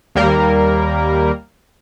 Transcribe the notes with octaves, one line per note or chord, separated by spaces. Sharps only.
D#2 G3 A#3 A#4